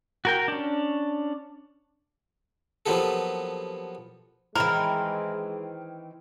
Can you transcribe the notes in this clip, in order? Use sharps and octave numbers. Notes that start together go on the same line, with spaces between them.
F#4 A#4 G5
C#4 D4
F3 F#3 A#3 B3 G4 A4
D#3 E3 G#3 C4 E4 A#4